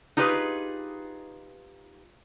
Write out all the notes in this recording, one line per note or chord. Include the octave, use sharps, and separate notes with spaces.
D#4 F4 G4 G#4 B4